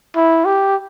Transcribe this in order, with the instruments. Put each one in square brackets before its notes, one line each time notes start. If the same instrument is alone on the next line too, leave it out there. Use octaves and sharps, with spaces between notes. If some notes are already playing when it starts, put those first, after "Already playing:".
[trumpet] E4
G4